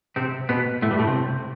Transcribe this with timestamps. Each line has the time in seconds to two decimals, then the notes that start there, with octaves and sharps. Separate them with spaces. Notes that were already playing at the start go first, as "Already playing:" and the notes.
0.16 C3 C4
0.49 B2 B3
0.82 A2 A3
0.91 G2 G3
0.99 A2 A3
1.07 C3 C4